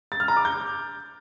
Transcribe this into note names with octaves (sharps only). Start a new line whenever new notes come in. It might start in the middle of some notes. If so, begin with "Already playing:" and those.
A6
F6
A#5
D6
G6